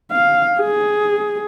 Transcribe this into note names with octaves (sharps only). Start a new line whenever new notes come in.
F5
G#4